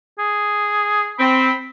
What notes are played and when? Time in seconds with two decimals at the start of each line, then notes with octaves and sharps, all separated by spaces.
0.19 G#4
1.19 C4 B5